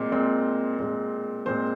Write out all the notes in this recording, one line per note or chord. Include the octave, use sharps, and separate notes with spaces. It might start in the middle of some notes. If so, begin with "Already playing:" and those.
Already playing: A#2 G#3 C4 D#5
A#2 G#3 C4
A#2 G#3 C4
A#2 G#3 C4 C5